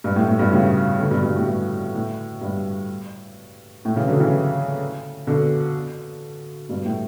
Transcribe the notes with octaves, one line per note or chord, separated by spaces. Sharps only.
G2
A2
A2
G2 B2
A2 C#3
B2 D3
G2 B2
G2
A2
G2
A2
G2
A2
C#3 E3
D3 F#3
C#3 E3
B2 D3
G2 B2
A2